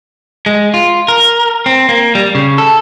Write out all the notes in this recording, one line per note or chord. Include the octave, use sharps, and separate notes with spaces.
G#3
F4
A#4
C4
A#3
G3
C#3
A4